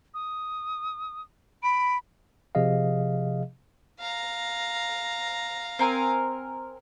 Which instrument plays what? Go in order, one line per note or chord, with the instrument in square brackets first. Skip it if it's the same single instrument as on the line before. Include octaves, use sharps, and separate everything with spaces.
[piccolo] D#6
[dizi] B5 [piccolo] D7
[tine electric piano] C3 F3 G#4 D#5 F5
[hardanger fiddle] F5 A#5
[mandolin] C4 A#4 G#5